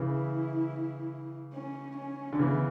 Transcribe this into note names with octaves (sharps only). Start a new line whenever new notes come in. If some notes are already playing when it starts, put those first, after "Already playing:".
Already playing: C#3 E3 E4
C#4
C#4
D3
C#3 E3 B3